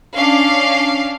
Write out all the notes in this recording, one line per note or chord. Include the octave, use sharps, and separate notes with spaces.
C#4 D4 F5